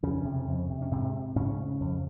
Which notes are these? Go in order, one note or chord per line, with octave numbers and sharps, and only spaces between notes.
F2 C#3 C#4
C3
F2
C3
C#4
G#2 C3 C4
G#2 C#3 C#4
F2